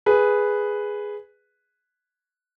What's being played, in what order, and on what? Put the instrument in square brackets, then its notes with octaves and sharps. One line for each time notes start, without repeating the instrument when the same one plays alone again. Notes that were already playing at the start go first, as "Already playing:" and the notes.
[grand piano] G#4 B4